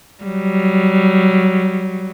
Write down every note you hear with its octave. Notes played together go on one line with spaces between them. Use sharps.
F#3 G3